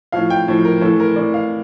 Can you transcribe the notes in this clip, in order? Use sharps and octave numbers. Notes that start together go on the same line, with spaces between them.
A2 F3 F5
G5
A2 F3
A#4
A2 E3 A4
A#4
A2 E3 D5
F5